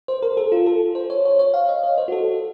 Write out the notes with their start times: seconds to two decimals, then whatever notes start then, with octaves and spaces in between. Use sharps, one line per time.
0.08 C5
0.22 A#4
0.37 A4
0.52 F4
0.66 A4
0.95 C5
1.10 C#5
1.25 C#5
1.39 C#5
1.54 F5
1.69 D#5
1.84 C#5
1.98 C5
2.08 F#4
2.12 A4